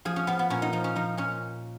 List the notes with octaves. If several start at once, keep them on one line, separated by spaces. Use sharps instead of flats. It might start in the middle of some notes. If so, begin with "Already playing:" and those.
F3 G#4
C#4
F3 B3
B3
A#2 C#4
D#4
F3 D#4
C#4
F3 D#4
A#2 C#4